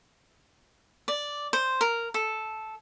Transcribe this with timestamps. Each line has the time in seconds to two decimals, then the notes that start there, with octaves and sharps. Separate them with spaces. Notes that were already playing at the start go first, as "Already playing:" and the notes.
1.08 D5
1.53 C5
1.81 A#4
2.14 A4